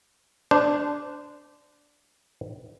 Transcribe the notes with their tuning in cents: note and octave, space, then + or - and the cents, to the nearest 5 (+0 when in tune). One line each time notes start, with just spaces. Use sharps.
D4 +0 C5 -25